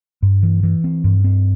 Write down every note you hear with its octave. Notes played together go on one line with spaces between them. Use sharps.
G2
E3
E3
C4
G2
C4